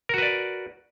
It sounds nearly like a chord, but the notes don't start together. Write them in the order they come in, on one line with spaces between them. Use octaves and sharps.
A#4 F#4 B4 D5